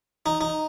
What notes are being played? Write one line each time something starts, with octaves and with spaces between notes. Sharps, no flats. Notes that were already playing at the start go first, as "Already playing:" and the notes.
D#4
D#4